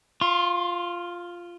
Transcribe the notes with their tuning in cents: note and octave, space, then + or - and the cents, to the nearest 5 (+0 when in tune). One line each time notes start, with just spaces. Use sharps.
F4 +0 C6 +45